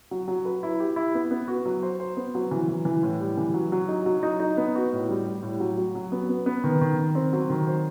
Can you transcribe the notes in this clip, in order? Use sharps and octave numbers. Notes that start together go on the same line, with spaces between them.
F#3
F#3
B4
E4
G4
E4
B3
B3
F#4
F#3
C5
C5
B3
F#3
E3
E3
E3
A2
G3
E3
F#3
F#3
D#4
F#3
D#4
D#4
B3
F#4
A2
G3
G3
A2
F#3
F#3
F#3
B3
B3
B3
D#3
D#3
D#3
C4
F#3
D#3
C5